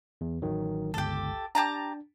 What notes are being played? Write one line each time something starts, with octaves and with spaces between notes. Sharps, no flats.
E2
A1 D#3 F#3
G1 C#2 G4 A4
D4 G4 A5 A#5